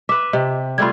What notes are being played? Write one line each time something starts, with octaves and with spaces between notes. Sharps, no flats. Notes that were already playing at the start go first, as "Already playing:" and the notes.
B4 E5 D6
C3 D#5
G3 A3 F4 B5 G#6